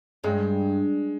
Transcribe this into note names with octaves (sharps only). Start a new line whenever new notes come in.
G2 G#3